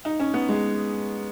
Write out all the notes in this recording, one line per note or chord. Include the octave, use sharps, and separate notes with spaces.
D#4
C#4
B3
G#3